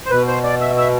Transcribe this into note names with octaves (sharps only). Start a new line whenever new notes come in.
C5
B2 B4
C5
D5
E5
E5